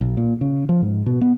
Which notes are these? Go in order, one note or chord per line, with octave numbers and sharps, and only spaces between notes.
B1
A#2
C#3
F3
G#2
B2
B3